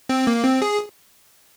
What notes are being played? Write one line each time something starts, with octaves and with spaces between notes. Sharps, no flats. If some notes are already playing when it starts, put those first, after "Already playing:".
C4
A#3
C4
G#4